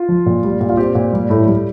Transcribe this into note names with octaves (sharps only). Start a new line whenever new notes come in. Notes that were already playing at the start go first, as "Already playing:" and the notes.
Already playing: F4
F3
A#2
G3
A#2
F4
C4 G4
A#2
G3
A2
G3